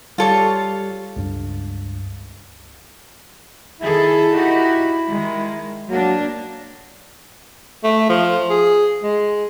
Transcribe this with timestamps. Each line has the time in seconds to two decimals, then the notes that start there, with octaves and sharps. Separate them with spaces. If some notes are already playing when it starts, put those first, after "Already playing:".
0.18 G3 F4 G4 A4 C#5
1.16 C#2 G2
3.80 D#3 E4 G#4 A4
4.32 D#4 F#4 G4
5.08 D#3 G#3
5.88 F#3 A#3 D4
7.84 A3
8.09 F3
8.50 G#4
9.03 G#3